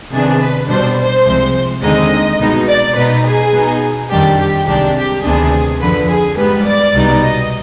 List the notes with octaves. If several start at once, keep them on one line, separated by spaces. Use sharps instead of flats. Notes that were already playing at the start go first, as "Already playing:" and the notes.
C3 D#3 B3 D4 G#4
B4
B2 G3 D4 C5
C5
C2 C3 F3 G#3
D#2 D3 G#3 C4 D#4 D#5
C2 B2 G#3 B3 D#4
D5
B2 B3 D#4 B4
G#4
B2 B3 D#4
F2 D#3 G3 D4 G4
G4
C2 C3 D#3 G#3 D4 G4
G4
D2 C3 D#3 B3 D4 G#4
F2 D3 F3 B4
G#4
G#2 G3 B3 B4
D5
C2 B2 G3 B3 D#4
D#5